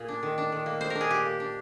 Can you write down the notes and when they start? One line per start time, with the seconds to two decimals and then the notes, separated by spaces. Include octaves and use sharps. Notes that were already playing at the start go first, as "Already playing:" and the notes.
Already playing: A#2 G#4
0.08 D4
0.23 D#3
0.38 D4
0.52 D#3
0.66 A#3
0.81 D#3 C5
0.90 A#4
0.95 D4
1.01 G#4
1.10 A#2 G4
1.26 A#3
1.40 D4